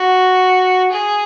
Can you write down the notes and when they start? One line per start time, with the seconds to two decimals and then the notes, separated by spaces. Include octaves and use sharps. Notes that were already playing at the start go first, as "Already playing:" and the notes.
Already playing: F#4
0.92 G#4